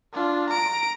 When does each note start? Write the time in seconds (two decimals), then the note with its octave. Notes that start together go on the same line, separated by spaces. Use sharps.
0.13 D4 F4
0.50 A#5 D7